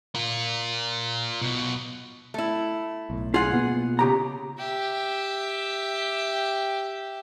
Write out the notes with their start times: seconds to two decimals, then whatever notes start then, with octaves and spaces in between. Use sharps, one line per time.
0.15 F4 A#4
1.41 B1 B2
2.34 A3 E4
3.10 B1 A2
3.34 F4 G#4 F#5
3.53 B2 A#3 B3
3.99 C#3 G4 A#5
4.59 G4 E5